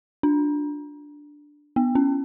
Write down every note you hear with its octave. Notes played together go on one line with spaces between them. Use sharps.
D4
B3
C#4